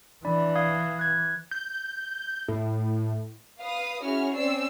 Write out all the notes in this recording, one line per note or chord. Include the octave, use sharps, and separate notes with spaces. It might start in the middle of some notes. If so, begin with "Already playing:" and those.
E3 D4 D5 B5
F5 D#6 G#6
F#6 G#6
G6
A2
B4 F5 D#6
C#4 E4 F#4 G#4 F6
C4 C#4 D5 E6 C7